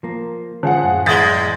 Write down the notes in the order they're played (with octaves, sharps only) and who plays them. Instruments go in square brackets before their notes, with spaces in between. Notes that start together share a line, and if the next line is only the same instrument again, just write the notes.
[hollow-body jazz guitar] F3 A#3
[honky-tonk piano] F3 G#4 F#5
[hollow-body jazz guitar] F#2 A2
[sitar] E2 G#3 [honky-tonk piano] D#6 A6 B6